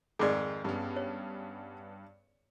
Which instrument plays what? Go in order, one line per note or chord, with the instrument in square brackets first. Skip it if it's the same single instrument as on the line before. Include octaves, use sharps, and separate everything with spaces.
[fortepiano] F2 G#2 [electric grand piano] D#3 [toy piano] G#4 D5
[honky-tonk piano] G2 [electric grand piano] B3 C#4
[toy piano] C#5